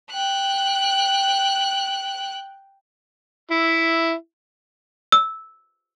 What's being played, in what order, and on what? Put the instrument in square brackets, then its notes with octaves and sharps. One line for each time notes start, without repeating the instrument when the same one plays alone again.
[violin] G5 F#6
[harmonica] E4
[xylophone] E6